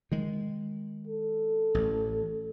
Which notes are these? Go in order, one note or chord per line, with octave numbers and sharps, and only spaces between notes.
D#3 G#3
A4
A1